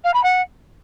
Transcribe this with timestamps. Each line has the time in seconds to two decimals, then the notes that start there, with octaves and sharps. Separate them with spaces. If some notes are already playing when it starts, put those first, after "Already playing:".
0.04 F5
0.14 B5
0.23 F#5